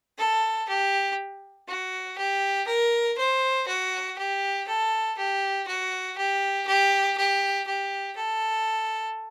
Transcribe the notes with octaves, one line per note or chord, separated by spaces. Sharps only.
A4
G4
F#4
G4
A#4
C5
F#4
G4
A4
G4
F#4
G4
G4
G4
G4
A4